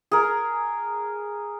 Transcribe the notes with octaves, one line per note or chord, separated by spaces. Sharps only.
G#4 A#4